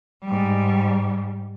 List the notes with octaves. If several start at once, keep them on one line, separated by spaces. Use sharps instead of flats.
G#2 G3